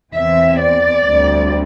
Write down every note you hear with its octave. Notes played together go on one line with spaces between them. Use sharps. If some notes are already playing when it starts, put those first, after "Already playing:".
E2 E3 C4 E5
D5
D2 D3 G3 C4